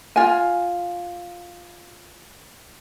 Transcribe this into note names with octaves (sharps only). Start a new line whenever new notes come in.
F4 G#5